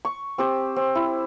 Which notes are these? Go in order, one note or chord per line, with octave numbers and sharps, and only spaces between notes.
C#6
C4 G4 C5
C4
E4